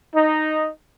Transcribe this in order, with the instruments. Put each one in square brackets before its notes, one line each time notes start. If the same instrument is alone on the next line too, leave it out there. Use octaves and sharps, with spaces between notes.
[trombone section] D#4